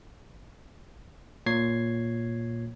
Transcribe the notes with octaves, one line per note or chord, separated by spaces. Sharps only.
A#2 C#5 G#6 C7